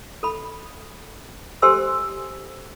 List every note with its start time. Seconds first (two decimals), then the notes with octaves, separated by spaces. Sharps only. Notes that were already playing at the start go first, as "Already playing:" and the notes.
0.23 A4 B5
1.62 G4 A4 C5 G#5 C6 E6